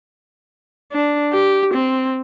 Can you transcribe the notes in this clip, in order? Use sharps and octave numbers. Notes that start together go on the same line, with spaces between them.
D4
G4
C4